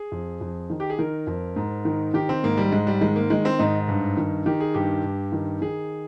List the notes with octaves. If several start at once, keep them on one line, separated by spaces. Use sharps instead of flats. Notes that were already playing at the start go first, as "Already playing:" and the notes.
Already playing: G#4
F2
F2
D#3
G4
G#4
D#3 A#4
F2
G#2
D#3
D#3 G4
C4
G#2 A#3
G3
G#2 G#3
G3
D#3 G#3
A#3
D#3 G#3
C4
G#2 D#4
G2
D#3
D#3 G4
G#4
G2 G4
G2
D#3
D#3 G#4